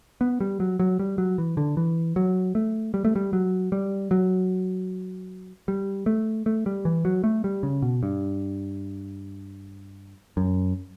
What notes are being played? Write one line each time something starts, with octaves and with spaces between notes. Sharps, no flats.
B3
G3
F#3
F#3
G3
F#3
E3
D3
E3
F#3
A3
G3
A3
G3
F#3
G3
F#3
G3
A3
A3
G3
E3
F#3
A3
G3
C#3
B2
G2
F#2